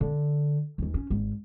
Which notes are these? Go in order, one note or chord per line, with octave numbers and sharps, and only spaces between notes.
D3
D#2 E3
C#4
G#1